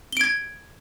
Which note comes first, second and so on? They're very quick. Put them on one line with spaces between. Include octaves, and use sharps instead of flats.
G7 D7 G#6